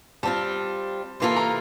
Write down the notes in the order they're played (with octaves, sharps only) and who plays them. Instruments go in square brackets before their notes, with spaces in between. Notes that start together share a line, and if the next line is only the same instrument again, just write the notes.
[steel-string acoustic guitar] G3 C4 F4 [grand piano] A5
[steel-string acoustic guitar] C3 E3 A#3 F4 A4 [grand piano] C6
[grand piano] A#5